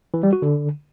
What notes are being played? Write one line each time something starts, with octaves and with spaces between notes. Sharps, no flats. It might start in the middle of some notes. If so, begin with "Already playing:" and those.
E3
G3
F#4
D3